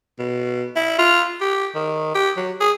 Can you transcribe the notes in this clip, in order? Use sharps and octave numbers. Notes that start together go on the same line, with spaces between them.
B2
E4
F4
G4
D#3
G4
F#3
G#4